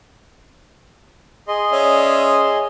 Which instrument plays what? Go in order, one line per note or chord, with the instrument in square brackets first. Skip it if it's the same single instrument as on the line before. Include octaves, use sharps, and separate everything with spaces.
[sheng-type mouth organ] G#4 D#5 C6
[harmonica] C#4 D5 E5